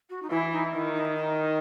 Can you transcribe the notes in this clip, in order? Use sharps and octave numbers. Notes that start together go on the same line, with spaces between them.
F#4
D#4
E3 E4
D#4
D#3 E4
D#4
E4
D#4